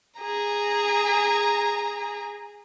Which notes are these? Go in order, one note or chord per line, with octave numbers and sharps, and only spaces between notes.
G#4 A#5